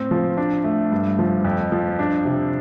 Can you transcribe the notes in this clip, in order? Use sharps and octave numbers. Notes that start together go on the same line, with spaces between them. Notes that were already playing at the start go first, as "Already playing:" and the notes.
Already playing: A2 C4
F3
D4
A3
G2
F3
F2
F3
D4
C3